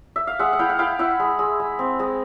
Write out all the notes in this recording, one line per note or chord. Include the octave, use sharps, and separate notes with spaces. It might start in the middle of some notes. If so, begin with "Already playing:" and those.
E5
F5
G#3 E5 F#5
F#5
E4 F5 G5
F#5
E4 F5 G5
E4 E5 F#5
G#3
G#3
G#3
C4
G#3